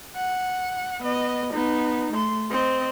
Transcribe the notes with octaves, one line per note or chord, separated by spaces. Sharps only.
F#5
B3 D#5
B3 D#4
A3 C6
C4 D#5